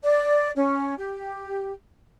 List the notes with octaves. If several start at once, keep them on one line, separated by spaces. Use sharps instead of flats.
D5
C#4
G4